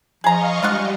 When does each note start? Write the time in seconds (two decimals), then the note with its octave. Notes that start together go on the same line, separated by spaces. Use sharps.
0.24 F3 G#4 D#5 F5 A#5 C#6
0.63 G3 G#3 D4 F4 F#5